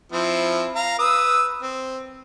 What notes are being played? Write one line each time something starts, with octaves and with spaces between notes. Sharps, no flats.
F3 C4 E4
F5 A#5
B4 D#6 E6
C4